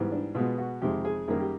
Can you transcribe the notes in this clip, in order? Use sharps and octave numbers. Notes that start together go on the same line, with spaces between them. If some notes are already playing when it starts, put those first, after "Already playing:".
Already playing: G#2 E3 G3 B3
D4
B2 G#3 B3 F4
F#4
F2 C3 D#3 G#3 G4
G#4
F#2 D#3 G3 A#3 G#4
G4